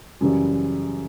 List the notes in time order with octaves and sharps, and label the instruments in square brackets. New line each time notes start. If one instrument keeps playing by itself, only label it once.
[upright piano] F#2 C#3 E3 G3